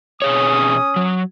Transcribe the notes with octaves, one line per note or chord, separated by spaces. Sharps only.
B2 C#4 G#4 C#5 D#6
F#3